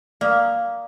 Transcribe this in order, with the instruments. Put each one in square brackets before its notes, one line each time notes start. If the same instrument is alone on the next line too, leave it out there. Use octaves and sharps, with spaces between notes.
[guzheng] A#3 [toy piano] D5 F5 D#6